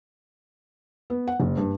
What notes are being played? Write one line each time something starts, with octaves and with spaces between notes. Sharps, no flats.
B3
F#5
F#1
G2